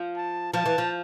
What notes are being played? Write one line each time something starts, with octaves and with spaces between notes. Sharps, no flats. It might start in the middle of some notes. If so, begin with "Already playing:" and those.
Already playing: F3
A5
F3 A5
E3
F3